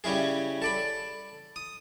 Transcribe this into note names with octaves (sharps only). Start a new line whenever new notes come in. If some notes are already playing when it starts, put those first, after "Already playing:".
C#3 G3 C#4 E4 G#4
A4 D5 B5
D#6